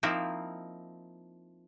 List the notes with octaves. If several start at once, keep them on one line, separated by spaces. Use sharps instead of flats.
F3 A#3 C4 D#4 E4